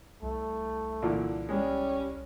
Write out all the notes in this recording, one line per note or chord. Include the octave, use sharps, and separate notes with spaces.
C2 A3
A#2 D3 E3
G3 G#3 C#4